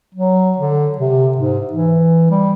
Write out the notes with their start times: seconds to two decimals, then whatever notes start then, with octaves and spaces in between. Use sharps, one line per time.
0.15 F#3
0.58 D3
0.98 C3
1.38 G#2
1.73 E3
2.30 G3